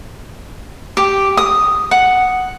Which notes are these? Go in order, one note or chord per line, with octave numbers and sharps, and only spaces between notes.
G4
D#6
F#5